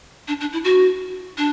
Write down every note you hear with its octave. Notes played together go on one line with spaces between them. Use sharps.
D4
D4
E4
F#4
D4